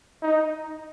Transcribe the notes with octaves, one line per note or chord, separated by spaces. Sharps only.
D#4